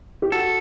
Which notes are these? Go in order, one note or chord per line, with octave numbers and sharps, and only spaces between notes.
G4
F#4 A4